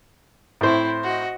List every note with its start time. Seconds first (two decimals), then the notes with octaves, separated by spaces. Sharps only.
0.61 A2 C4 E4 C5
1.03 F#4 D#5